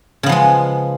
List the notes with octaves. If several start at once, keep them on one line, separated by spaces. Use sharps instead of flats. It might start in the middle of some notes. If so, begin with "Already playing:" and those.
C#3 F3 G#3 B3